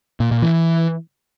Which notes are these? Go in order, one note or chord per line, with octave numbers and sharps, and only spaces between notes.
A#2
A#2
E3